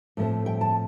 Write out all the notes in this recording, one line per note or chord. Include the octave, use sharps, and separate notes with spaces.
A2 F3 A3 C4
G5
A5